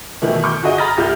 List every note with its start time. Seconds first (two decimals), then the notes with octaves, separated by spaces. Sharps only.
0.22 B2 D#3 E3 A3
0.44 C#6 D6 G6
0.62 D3 F#4 G#4 D#5 D#7
0.78 A#5 B5 D#6 F6 A6 A#6
0.97 C2 G4 F6 G6